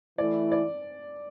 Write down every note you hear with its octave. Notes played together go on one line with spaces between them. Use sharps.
E3 A3 E4 D5
D5